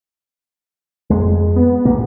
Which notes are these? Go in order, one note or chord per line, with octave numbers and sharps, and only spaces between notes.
F2 G#3
B3
C2 A#2 A#3